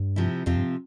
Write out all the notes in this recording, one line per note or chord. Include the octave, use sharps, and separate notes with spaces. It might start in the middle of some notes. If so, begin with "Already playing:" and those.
Already playing: G2
C3 F3 C4 E4
F2 C3 F3 C4 F4
G2